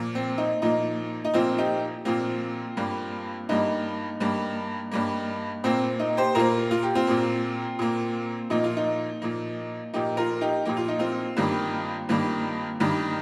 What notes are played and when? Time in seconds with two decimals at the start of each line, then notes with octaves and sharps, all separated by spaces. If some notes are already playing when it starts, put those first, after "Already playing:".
Already playing: A#2 F3 A#3
0.15 C4
0.38 D#4
0.62 A#2 F3 A#3 D#4
1.25 D#4
1.34 A#2 F3 A#3 C4 F4
1.58 D#4 G4
2.05 A#2 F3 A#3 C4 F4
2.77 G2 G3 A#3
3.49 G2 G3 A#3 D#4
4.20 G2 G3 A#3
4.92 G2 G3 A#3
5.64 A#2 A#3 C4
6.00 D#4
6.17 G4 C5
6.35 A#2 A#3 F4 A#4
6.71 F4
6.83 G4
6.95 C4 F4
7.07 A#2 A#3
7.79 A#2 A#3
8.50 A#2 F3 A#3 D#4
8.64 F4
8.77 D#4
9.22 A#2 F3 A#3
9.94 A#2 F3 A#3 D#4 G4
10.17 F4 A#4
10.41 D#4 G4
10.65 A#2 F3 A#3 G4
10.77 F4
10.88 D#4
10.99 C4 F4
11.37 G2 D#3 G3 A#3
12.09 G2 D#3 G3 A#3
12.80 G2 D#3 G3 A#3